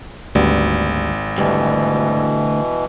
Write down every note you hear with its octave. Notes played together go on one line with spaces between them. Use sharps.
G#1 D2 G3 B3
D2 B2 E3 G3